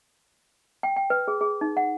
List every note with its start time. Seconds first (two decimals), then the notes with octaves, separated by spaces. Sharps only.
0.83 G5
0.96 G5
1.10 B4
1.28 G#4
1.41 G#4
1.61 D#4
1.77 F#5